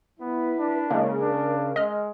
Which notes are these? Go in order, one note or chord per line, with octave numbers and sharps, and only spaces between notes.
B3 E4 B4
D4
C#3 G#3 A#3 A#4
D4
G#3 D#5 F6